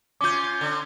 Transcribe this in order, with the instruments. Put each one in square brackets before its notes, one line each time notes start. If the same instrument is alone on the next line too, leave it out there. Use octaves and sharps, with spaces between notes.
[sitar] C#4 F4 [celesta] D6 G6
[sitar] D3